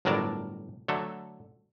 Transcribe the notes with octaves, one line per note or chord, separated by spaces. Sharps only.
G1 A2 F#3 A#4 D5 A5
D3 F#3 A3 A4